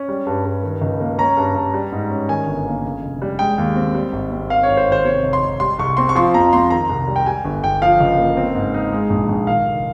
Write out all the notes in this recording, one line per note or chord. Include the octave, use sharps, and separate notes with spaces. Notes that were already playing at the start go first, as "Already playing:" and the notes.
Already playing: C#4
G3
G2
G2
D#3
C#2
A#3
C#4 A#5
G2
G2
G3
G#2
C#4
D#3 G#5
G1
A#3
C#3
F1
G3
G#3 G5
D#2
C4
G3
G#1
C4
D#3 F5
G#1 C#5
C5
G#1 C5
C3 C#5
F1
C6
F1
G3 C6
C2 C#6
C4 C6
C#6
F3 C6
F2 A#5
F2 C6
D#3 A#5
C2
G3
G5
G3 G#5
G1
G1 G5
F3 F5
C#2
A#3
C4
G#2
D#4
G#3
A#1
A#1
D#3 F5
F1